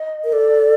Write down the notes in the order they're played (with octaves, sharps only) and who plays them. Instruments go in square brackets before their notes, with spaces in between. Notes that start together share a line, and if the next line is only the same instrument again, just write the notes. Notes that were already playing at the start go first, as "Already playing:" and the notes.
Already playing: [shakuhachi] D#5
[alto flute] A#4
[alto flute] A4 [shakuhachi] D5